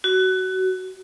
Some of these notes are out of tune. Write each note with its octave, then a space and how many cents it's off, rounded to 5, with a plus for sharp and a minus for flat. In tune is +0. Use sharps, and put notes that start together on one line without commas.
F#4 +20